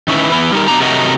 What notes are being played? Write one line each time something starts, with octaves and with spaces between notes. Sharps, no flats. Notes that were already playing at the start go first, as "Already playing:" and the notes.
D#3 C#4 E4 B4
E3 B3 E4
G3 D#4 A#4
B2 D#3 D4 A#5
C3 D#3 F#3 A3 D#4 F#4